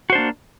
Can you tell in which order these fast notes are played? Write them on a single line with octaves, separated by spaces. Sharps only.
F#4 C5 D4 A#3